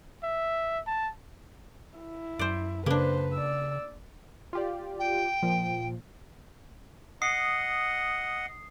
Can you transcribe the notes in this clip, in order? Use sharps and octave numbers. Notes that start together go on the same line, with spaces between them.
E5
A5
E4
F#2 C5 D5
C#3 A#3 D4 B4 C5
D5 E6
F4 G4 D5
G5
A#2 F3
D#5 F#5 D#6 C7